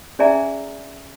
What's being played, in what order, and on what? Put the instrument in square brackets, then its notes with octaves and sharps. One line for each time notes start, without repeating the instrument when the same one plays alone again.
[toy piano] C#4 G#4 D5 E5 G#5 A#5